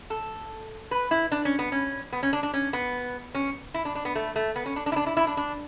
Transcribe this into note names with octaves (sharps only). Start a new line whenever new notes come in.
A4
B4
E4
D4
C#4
B3
C#4
B3
C#4
D4
D4
C#4
B3
C#4
E4
D4
D4
B3
A3
A3
B3
C#4
D4
D4
E4
D4
E4
E4
D4
D4